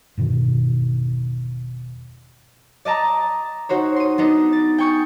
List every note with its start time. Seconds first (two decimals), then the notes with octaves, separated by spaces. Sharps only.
0.17 E1 G2 B2 D#3
2.85 D5 D#5 A5 A#5
3.69 D#4 F#4 C5 C#5
3.96 C6 D#7
4.18 B3 D4 D#4
4.52 A6
4.78 G5 G#5 C#6 D#6 G6